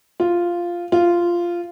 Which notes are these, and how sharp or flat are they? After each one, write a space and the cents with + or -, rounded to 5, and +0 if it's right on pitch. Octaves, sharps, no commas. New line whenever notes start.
F4 -5
F4 -10